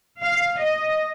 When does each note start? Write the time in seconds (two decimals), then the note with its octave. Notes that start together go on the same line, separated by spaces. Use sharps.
0.23 F5
0.61 D#5